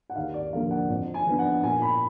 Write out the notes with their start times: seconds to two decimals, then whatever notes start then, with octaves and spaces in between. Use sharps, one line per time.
0.10 F#5
0.16 D#2 F5
0.34 D5
0.53 D3 F3 A#3 F5
0.71 F#5
0.89 F2
1.14 G#5
1.26 F3 B3 D4
1.39 F#5
1.63 A#2 G#5
1.82 B5